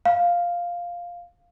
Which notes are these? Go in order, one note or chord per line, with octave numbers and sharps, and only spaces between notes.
F5